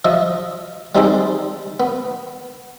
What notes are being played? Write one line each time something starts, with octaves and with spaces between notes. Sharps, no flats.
F3 D#5 E5
G3 C4 D#4 G#4 A4 C5
B3